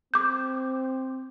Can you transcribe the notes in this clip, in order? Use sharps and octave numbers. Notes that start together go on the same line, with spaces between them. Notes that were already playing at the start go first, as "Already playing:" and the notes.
C4 D6 G6